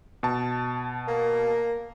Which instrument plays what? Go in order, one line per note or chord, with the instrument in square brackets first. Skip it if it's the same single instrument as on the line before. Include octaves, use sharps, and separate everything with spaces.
[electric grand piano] B2 A5
[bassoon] A#3